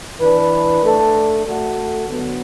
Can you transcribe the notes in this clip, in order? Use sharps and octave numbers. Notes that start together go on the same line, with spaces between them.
E3 D4 B4
A3 D4 A4
A3 F#4 A4
D3 F#3 B3